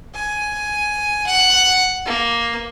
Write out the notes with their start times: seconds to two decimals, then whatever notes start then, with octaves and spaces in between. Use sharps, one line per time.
0.15 G#5
1.26 F#5
2.06 A#3